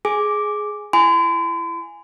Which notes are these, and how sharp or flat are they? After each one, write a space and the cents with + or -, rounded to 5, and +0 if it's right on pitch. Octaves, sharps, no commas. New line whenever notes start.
G#4 +10 G#5 +0 D6 +0
E4 +30 G#5 +0 C6 -45